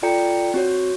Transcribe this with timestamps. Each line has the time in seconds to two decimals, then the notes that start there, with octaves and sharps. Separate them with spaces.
0.03 F4 A4 D5 G5 A#5 C#7
0.54 C4 F#4 C#5